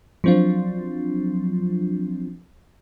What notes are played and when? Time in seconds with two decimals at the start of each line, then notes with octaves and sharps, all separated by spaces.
0.24 F3 F#3 C4 D4 F4